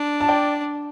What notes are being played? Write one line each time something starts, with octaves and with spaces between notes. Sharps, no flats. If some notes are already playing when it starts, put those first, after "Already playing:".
Already playing: D4
A5
D5 G5